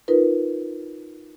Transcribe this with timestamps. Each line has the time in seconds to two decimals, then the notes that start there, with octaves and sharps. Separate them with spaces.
0.08 D#4 F4 A#4 B4